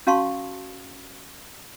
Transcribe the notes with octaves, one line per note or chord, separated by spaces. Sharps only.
C#4 F#4 F5 A5 C6 C#6